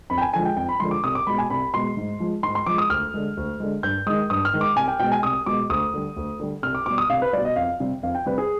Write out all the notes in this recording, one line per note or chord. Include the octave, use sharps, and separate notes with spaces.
F2 B5
G5
G#5
D3 F3 G#3 G#5
G5
F2 G5
B5
D3 F3 G#3 C6
D6
C2 D#6
D6
B2 G#3 B5
G#5
C2 B5
B2 G#3 C6
G#2
F3 G#3
G#2 C6
C6
F3 G#3 D6
D#6
D2 F6
D3 G#3
D2
D3 G#3
G2 G6
D#3 G#3 D#6
G2 D#6
F6
D#3 G#3
D6
C2 G#5
G5
B2 G#3 G5
G#5
C2 D#6
B2 G#3 D6
D2 D#6
D3 G3
D2
D3 G3
C2 F6
D6
B2 G3 D6
D#6
C2 F5
B4
B2 G3 D5
D#5
F2 F5
C3 G3
F2 F5
G5
C3 G3 B4
G#4